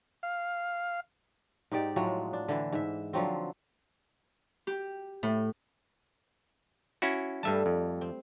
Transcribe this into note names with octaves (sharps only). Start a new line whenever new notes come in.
F5
G#2 D#4 G4 D5
A2 F3 F#3 G#3
D4
D3 E3
G#2 E5
D3 F3 F#3 C4
G4
A2
C#4 E4 F#4
G2 G3 A3 E5 A5
F2
C4